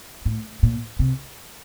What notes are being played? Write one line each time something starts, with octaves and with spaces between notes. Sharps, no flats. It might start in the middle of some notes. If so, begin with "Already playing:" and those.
A2
A#2
C3